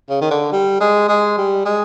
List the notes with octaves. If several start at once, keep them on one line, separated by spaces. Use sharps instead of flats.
C#3
D#3
D3
G3
G#3
G#3
G3
G#3